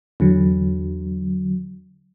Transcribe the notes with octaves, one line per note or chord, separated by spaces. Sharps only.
E2 D3 F#3